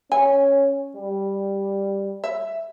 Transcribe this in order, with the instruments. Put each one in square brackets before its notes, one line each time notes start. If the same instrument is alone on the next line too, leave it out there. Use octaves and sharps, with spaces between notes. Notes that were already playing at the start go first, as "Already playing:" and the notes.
[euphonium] C#4 [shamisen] G#5
[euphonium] G3
[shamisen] E5